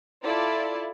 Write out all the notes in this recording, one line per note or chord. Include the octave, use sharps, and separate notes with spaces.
E4 F4 A4 D5